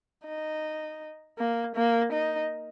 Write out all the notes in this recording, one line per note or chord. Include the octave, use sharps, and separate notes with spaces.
D#4
A#3
A#3
D#4